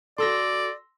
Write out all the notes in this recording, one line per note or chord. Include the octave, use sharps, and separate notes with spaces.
F#4 A4 D5 C6 E6 A#6